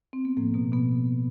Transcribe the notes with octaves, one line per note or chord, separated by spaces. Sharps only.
C4
B3
A2 F3 A#3
B2 B3
B2 B3